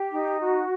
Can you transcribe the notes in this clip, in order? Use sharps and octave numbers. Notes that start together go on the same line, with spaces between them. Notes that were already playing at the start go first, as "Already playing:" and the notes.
Already playing: G4
D#4
F#4